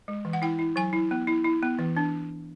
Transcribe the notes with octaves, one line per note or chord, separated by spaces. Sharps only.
G#3
E3
F#5
E4 G5
E4
F#3 G#5
E4
B3
E4
E4
B3
E3
D4